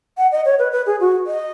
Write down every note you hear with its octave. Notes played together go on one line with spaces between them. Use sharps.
F#5
D#5
C#5
B4
B4
G#4
F#4
D#5